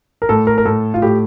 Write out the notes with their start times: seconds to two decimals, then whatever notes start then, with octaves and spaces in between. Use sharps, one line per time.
0.22 A#4
0.29 A2 A4
0.47 A#4
0.58 A#4
0.65 A2 A4
0.94 F4
1.02 A2 G4